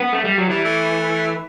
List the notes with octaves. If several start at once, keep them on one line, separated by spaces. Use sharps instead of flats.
B3
A3
G3
F#3
E3 G3
A3